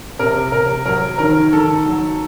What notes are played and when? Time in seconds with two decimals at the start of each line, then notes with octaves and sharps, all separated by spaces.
0.19 C3 A#4
0.52 C3 A#4
0.86 F#3 A#4
1.18 D#3 A#4
1.53 D#3 A4
1.86 F#3